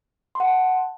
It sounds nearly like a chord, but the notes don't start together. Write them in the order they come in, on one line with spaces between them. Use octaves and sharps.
C6 F#5 A5